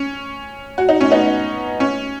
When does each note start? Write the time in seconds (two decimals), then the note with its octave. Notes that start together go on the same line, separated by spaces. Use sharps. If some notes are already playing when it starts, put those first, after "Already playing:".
Already playing: C#4
0.78 F#4
0.89 D#4
1.01 C#4
1.11 B3 D#4
1.80 C#4